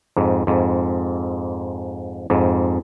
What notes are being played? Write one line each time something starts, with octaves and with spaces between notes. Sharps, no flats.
F2 G#2
F2 G#2
F2 G#2